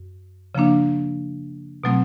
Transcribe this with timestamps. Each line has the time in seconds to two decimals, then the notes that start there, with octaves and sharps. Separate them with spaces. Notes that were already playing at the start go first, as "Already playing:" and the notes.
Already playing: F#2
0.55 C#3 F3 A#3 D4
1.84 B2 F#3 A3 C4